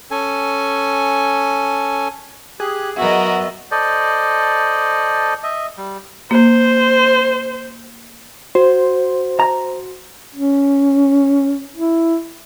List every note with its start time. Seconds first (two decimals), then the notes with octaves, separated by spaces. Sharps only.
0.11 C#4 A4 G#5
2.60 G4 G#4 F#6
2.97 F#3 B3 F#4 A#4 D#5 E5
3.71 A4 C5 D5 D#5
5.43 D#5 E5
5.77 G3
6.31 A#3 C5
8.55 F#4 C5
9.40 A#5
10.35 C#4
11.76 E4